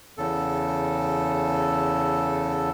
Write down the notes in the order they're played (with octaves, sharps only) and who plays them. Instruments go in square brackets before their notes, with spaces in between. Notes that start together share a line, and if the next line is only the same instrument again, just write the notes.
[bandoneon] E2 C#3 A4